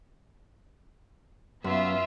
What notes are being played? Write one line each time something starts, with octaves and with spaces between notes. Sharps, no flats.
F#2 B3 F4 E5